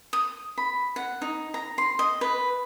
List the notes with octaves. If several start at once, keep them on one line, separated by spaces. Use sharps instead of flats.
D#6
B5
F#5
D#4
A#5
C6
D#5
B4